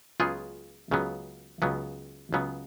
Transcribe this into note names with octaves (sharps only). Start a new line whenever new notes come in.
C#2 C#3 F#3 B3 F4 G#4
C#2 C#3 F#3 B3
C#2 C#3 F#3 B3
C#2 C#3 F#3 B3